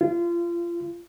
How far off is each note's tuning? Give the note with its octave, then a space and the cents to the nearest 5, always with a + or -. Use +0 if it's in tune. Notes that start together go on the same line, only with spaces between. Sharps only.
F4 -30